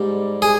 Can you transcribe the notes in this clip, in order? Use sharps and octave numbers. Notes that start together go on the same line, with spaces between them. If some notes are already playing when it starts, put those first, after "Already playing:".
Already playing: G#2 G3
G#4